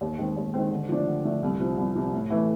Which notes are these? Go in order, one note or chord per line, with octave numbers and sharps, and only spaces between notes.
D#2
D#3 G#3 C4
D#2
D#3 G#3 C4
D3
F3 A3 D4
D3
F3 A3 D4
C2
C3 F3
C2
C3 F3
A2
E3 A3